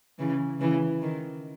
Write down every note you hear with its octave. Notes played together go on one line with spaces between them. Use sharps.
C#3 E3
C#3 E3
D#3